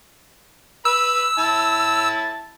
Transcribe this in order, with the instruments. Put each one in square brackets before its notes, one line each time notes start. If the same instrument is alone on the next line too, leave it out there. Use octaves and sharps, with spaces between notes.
[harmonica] B4 B5 [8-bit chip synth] E6
[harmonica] E4 A5